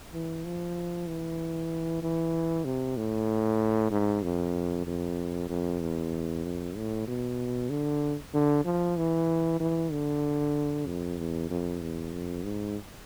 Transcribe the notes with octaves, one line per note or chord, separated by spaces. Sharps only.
E3
F3
E3
E3
C3
A2
G#2
F2
F2
F2
E2
F2
A2
B2
D3
D3
F3
E3
E3
D3
F2
E2
F2
E2
F2
G#2